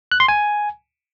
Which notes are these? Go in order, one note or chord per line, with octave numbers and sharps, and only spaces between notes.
F#6
C6
G#5